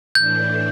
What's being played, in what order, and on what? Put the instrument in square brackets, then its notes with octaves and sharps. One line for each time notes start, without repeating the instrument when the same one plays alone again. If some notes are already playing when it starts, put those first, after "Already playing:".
[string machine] A2 E3 A3 D4 [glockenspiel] G6